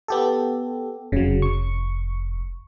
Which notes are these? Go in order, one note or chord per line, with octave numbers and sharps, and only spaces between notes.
B3 G4 A4
F1 C#3 F#3
C#6